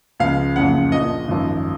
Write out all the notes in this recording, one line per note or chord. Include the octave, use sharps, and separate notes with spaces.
C#2 C#3 F3 F5
F#1 F2 C#3 F3 F#5
A#1 A#2 F3 D#5
G#1 F#2 F3